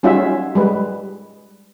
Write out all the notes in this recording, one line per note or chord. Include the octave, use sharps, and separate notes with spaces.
G3 C#4 D#4 F4 F#4 E5
G3 G#3 B4